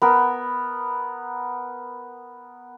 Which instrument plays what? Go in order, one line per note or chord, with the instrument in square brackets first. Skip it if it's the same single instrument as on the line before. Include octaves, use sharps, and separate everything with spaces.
[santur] B3 A#4